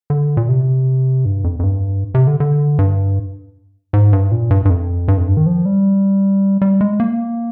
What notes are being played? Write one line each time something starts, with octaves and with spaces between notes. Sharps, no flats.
D3
A#2
C3
G2
F2
F2
G2
C3
D3
D3
G2
G#2
G2
A#2
G2
G2
F2
G2
F2
G2
D#3
F3
G3
G3
G#3
A#3